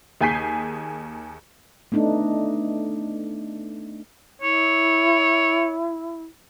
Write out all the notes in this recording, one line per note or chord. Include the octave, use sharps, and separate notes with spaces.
D#2 G#4 G#5 G6 B6 C7
A3 B3 D4 D#4
E4 C#5